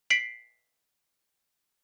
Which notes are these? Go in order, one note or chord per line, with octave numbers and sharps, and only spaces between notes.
B6 C7 D7 F#7